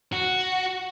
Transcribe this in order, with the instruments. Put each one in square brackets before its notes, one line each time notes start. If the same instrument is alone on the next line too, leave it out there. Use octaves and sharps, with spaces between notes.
[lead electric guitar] F#4